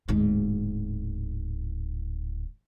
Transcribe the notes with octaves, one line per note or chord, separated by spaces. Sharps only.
D1 G#2